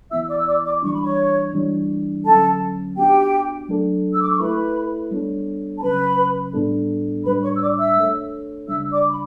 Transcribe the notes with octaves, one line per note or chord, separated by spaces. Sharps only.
E3 B3 E4 E5 E6
D5 D6
E6
D5 D6
D5 D6
E3 G3 D4 C#6
B5
C#5 C#6
E3 G3 D4
D3 F#3 C#4 A4 A5
B3 D4 F#4 G4 G5
F#3 A3 D4 A4
E6
D6
C#6
A3 E4 A4 B4 B5
G3 B3 D4 A4 C#5
A5
C#3 F#3 C#4 B4 B5
A2 G3 B3 D4 A4
A2 G3 D4 B4 B5
C#5 C#6
E6
D5 D6
E5 E6
A3 D4 A4 C#5
C#3 G3 D4 E5 E6
D5 D6
B5